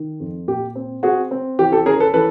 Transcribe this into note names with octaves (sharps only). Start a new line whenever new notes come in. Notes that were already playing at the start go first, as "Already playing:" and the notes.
Already playing: D#3
F2
A#2 G4
C4
C4 F#4 G#4
C4
E3 G4
G4 A4
C#4 G#4 A#4
A4 B4
E3 A4 B4